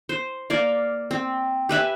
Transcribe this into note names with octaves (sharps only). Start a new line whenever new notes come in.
C5
A#3 D5 F5
C4
G4 B4 E5 G#5